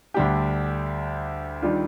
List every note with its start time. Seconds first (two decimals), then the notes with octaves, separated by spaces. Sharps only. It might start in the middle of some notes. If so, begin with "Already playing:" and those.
0.14 D2 D3 G3 D4 G4
1.62 D#3 G3 D4 F4